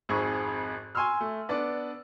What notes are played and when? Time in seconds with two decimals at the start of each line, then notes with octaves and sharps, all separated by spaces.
0.09 G#1 F2 G#2 G#4 C#6
0.95 G#5 C6 C#6 E6 F6
1.21 A3
1.49 B3 D4 D5